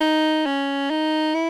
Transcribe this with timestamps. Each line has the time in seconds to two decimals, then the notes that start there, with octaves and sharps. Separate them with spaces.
0.01 D#4
0.46 C#4
0.90 D#4
1.34 E4